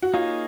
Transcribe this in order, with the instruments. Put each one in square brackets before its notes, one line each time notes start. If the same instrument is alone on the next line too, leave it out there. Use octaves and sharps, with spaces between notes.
[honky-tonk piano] F#4
[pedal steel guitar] A#3 D#4 G#4 C#5 [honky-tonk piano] F4